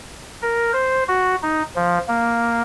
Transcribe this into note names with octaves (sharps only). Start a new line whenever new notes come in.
A#4
C5
F#4
D#4
F3
A#3